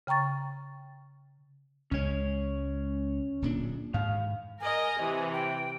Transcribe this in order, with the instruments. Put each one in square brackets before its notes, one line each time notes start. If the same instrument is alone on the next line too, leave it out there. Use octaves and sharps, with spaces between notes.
[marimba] C#3 G5 A#5 C#6 A6
[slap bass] C#2 G#3 [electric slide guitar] C#4 C#5
[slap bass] D1 A#2 D4
[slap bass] G#2 [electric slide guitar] D#3 F5
[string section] A#4 D#5 [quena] G#5
[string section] C3 E3
[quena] G5